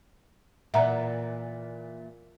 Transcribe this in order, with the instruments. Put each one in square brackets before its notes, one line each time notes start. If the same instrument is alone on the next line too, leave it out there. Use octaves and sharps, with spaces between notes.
[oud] A#2 E3 [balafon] E5 F#5 A#5